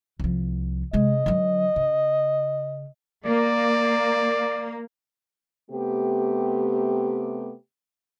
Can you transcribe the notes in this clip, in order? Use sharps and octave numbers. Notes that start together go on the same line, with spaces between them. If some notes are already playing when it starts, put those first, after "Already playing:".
C2 F3
C3 G#3 D#5
D3 F#3
C#3
A#3 D5
C3 A3 B3 G4